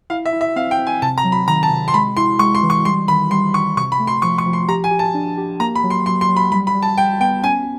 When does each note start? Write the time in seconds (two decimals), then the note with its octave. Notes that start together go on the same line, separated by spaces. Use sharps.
0.10 E4 F5
0.26 E5
0.33 E4
0.41 E5
0.56 C4 F5
0.71 G5
0.78 C4
0.87 G#5
1.02 C3 A5
1.18 A#5
1.25 F#3
1.32 B5
1.48 D#3 A#5
1.63 A5
1.70 C3
1.88 C6
1.94 G#3 B5
2.17 E4 C6
2.39 G#3 C#6
2.55 C6
2.63 E3
2.70 C#6
2.85 G3 C6
3.08 D#3 B5
3.31 G3 C6
3.54 D#3 C#6
3.77 C3 C#6
3.92 B5
3.99 A3
4.07 C6
4.22 F3 C#6
4.38 C#6
4.46 F3
4.53 C6
4.68 G4 A#5
4.84 G#5
4.91 G4
4.99 A5
5.14 D4
5.37 G4
5.60 A#3 A#5
5.75 B5
5.84 F#3
5.90 C6
6.06 F#3 C6
6.21 C6
6.29 F#3
6.37 B5
6.52 G3 B5
6.67 B5
6.75 G3
6.83 A5
6.98 G3 G5
7.20 B3 G5
7.43 C#4 G#5